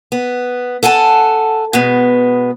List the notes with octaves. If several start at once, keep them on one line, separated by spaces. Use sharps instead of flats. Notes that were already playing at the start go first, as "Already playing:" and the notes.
B3
A4 F#5 G#5 A5
B2 G#3 B3